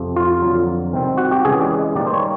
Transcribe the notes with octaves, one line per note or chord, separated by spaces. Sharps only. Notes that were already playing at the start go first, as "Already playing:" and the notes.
Already playing: F2 C3 F3
F4
F2 D3 F#3
C3 D#3 G3 C4
F#4
G4
C#3 E3 G#3 C#4 G#4
D5
D#5
D#3 G3 A#3 D5
C5
C#5